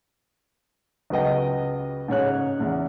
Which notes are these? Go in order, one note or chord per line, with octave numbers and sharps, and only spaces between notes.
C#2 F#3 B3 D#5 G5
G#2 C#3 C#5 F#6
E2 C#3